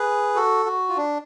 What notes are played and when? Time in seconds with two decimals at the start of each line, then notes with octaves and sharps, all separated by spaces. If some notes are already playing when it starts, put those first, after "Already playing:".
Already playing: G#4 B4
0.35 F#4 A4
0.66 F#4
0.89 F4
0.97 D4